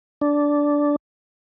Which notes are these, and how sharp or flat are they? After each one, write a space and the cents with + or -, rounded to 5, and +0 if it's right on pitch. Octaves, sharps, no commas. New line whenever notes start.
D4 -10